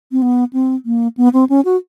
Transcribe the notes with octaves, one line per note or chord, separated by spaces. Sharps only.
C4
B3
C4
A#3
B3
C4
C#4
F#4